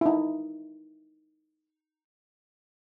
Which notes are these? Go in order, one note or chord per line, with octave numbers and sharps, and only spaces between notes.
D#4 E4